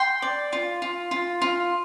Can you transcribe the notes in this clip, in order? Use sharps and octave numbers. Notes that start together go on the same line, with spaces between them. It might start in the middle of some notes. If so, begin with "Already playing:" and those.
Already playing: G5 C6
D5
F4
F4
F4
F4